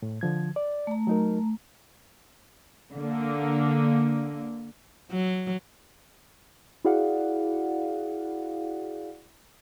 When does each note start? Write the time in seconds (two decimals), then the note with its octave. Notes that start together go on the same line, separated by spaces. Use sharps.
0.02 A2
0.21 D3 F3 G#6
0.56 D5
0.87 A3 A#5
1.07 F#3 D#4 A#4
2.95 D3 A#3
5.11 F#3
6.85 E4 F#4 G#4 D5 F5 F#5